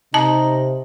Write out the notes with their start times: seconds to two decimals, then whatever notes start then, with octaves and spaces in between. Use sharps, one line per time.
0.14 C3 D#4 A5